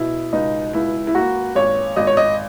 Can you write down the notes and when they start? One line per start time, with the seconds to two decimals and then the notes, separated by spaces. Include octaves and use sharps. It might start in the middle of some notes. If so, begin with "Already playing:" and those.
Already playing: B2 E4
0.33 C#2 D#4
0.73 C#2 E4
1.07 E4
1.15 A#3 F#4
1.55 G#1 C#5
1.96 G#1 D#5
2.07 C#5
2.17 D#5